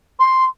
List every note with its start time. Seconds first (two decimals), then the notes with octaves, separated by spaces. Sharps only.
0.19 C6